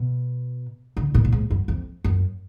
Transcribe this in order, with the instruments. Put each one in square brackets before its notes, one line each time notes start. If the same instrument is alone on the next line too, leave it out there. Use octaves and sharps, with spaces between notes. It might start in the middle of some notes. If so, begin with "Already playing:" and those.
Already playing: [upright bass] B2
D3
A#2
A#2
G#2
F#2
F2
F#2